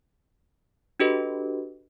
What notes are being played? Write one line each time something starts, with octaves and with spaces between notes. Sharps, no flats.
D4 F#4 G4 A4 B4 D#5